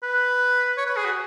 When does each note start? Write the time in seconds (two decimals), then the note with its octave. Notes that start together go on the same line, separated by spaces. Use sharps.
0.03 B4
0.78 C#5
0.86 B4
0.97 G#4
1.05 F#4